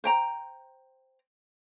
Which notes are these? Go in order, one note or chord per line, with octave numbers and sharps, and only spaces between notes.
C5 G5 A#5